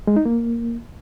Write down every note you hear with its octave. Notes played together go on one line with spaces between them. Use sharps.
G#3
D#4
A#3